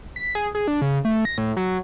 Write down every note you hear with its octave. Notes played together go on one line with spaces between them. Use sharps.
B6
G#4
G#4
D4
C#3
A3
A#6
A2
F#3